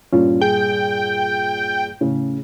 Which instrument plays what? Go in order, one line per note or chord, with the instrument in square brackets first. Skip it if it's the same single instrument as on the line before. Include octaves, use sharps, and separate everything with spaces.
[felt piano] G2 A#2 [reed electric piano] C#4 F4
[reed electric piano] G#4 [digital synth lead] G5
[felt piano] A2 C#3